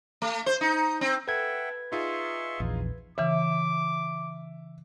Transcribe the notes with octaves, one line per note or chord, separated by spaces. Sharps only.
A3
C5
D#4
C4
A4 B4 E5 F#5 G5 G#6
D#4 F4 G#4 E5 C6 C#6
A#1 E2
C#3 E3 E5 D6